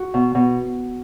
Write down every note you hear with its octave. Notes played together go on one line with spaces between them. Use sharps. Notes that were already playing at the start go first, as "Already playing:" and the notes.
Already playing: F#4
B2
B2